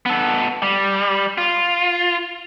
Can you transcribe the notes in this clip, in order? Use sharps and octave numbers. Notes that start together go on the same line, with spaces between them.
B3 A4
G3
F4